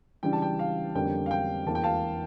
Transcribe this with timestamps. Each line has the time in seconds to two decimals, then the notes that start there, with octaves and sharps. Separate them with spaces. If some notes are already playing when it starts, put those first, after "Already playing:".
0.23 C#3 E3 G3 D4 G5
0.33 A5
0.42 G5
0.59 F5
0.95 F2 D3 G3 A#3 C#4 G5
1.26 F5
1.31 G5
1.67 E2 E3 A#3 A5
1.75 G5
1.84 F5 A5